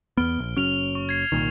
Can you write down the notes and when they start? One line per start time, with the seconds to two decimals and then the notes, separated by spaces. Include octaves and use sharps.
0.17 E2 B3 F6 D7 G7
0.39 A#1
0.57 F#1 F#3 C#4 F6 D7 F7
0.95 C#6
1.09 G#6 C7
1.32 C2 A#2 D#3